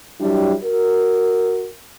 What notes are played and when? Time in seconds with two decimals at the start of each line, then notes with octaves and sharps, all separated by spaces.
0.20 F#3 G3 D4 E4 G4
0.63 F#4 A#4